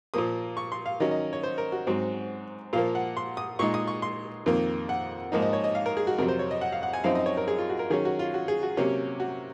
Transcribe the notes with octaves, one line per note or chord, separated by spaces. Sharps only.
A#2 F3 A#3 D#6
C#6
C6
F5
D#3 F#3 C#4 D#5
D#5
C#5
C5
A#4
F#4
G#2 F#3 C4
A#2 F3 A#3 F5
F#5
C6
D#6
A#2 G#3 D#4 C#6
D#6
C#6
C6
F2 D#3 A#3
F#5
G#2 F3 A#3 D#4
D#5
C#5
D#5
F5
A#4
G#4
F#4
F2 C3 F#3 A#4
C5
C#5
D#5
F#5
F5
F#5
G#5
F#2 F3 C4 D#4 F5
D#5
C#5
A#4
G#4
F4
F#4
A#4
D#3 F#3 C#4 G#4
F#4
F4
F#4
G#4
F#4
C3 F#3 A#3 C#4
F#4